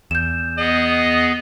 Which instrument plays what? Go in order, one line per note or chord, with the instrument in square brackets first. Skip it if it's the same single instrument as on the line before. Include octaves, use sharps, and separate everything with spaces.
[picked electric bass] E2 [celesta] G6 E7
[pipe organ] B3 G#4 [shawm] D#5